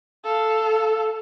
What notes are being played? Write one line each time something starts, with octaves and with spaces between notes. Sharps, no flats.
A4 F5